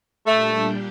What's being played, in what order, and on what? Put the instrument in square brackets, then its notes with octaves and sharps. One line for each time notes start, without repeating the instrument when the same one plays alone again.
[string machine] A#2 G3 D4 G4 [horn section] A3